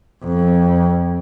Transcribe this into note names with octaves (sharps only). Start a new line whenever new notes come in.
F2